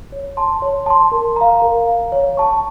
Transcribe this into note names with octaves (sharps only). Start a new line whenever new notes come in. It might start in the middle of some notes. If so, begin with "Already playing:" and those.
C#5
A5 C6
C#5
A5 C6
A#4
F5 A#5
A#4
F5 A#5
C#5
A5 C#6